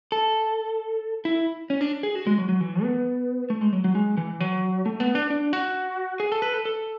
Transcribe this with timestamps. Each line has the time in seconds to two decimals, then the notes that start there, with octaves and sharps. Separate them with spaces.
0.12 A4
1.25 E4
1.70 C#4
1.81 D4
2.03 G#4
2.15 F#4
2.27 G#3
2.38 F#3
2.49 F#3
2.60 E3
2.83 B3
3.50 A3
3.61 G#3
3.73 F#3
3.84 F#3
3.95 G#3
4.17 E3
4.41 F#3
4.86 A3
5.00 B3
5.15 D4
5.30 D4
5.53 F#4
6.20 G#4
6.32 A4
6.42 B4
6.54 A4
6.65 A4